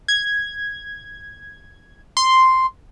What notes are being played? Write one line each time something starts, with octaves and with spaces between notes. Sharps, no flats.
G#6
C6